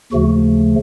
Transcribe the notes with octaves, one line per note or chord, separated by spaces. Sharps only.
D#2 C#3 F3 A3 F#4